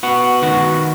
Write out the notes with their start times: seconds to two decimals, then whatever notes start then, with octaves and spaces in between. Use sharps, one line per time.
0.03 B3 F#4
0.42 D#3 F#4